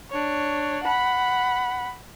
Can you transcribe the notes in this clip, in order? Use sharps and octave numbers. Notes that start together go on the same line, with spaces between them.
D4 C#5
F#5 B5